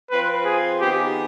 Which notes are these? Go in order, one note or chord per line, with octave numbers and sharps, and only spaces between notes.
F3 C4 F4 B4 C5
G#4
D#3 B3 D#4 G4 G#4